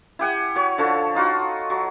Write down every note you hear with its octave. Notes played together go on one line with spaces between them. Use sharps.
E4 G4 F#5 G#5
F#4 C#5
D3 F3 A4 C#5
D#4 F4 F#4
F#3